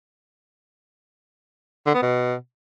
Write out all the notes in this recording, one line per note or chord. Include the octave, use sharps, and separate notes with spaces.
D3
B3
B2